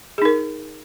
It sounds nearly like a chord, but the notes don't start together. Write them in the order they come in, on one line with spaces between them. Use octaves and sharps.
G#4 D#4 A#4